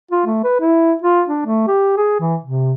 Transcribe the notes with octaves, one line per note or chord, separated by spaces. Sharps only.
F4
A3
B4
E4
F4
D4
A3
G4
G#4
E3
C3